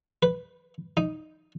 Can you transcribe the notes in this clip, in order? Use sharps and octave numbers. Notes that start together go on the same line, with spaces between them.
B4
D#4